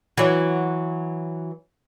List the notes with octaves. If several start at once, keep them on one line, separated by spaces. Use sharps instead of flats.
E3 F#3